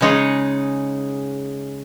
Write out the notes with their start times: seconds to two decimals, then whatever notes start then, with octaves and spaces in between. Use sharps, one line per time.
0.01 C#3 G#3 D#4 G#4 C#5